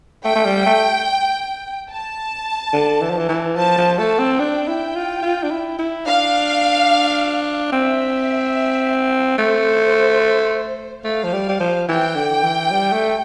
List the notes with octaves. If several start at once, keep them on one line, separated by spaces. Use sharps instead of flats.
A3 G5
A3
G3
A3
A5
D3
E3
F3
E3
E3
F3 A5
F3
A3 A5
C4
D4 G5
E4
F4
F4
D4
E4
E4
D4 F5
C4 E5
A3 C5
A3 F5
F3
G3
G3
F3
E3 G5
D3
E3
G3
A3